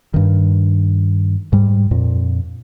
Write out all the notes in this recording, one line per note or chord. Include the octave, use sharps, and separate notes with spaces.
G2 D#3
G#2 G3
F2 A#2